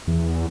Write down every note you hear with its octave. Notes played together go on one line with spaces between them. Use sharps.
E2